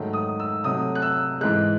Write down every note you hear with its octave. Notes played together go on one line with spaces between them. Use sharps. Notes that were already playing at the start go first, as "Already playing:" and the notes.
Already playing: G#2 D#3 F#3 A3
D#6
E6
C3 F#3 A3 D#6
F#6
E6
G#2 E3 G#3 F#6